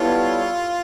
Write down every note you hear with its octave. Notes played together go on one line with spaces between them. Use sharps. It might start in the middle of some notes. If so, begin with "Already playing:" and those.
Already playing: G3 B3 E4 F4 A4 C#5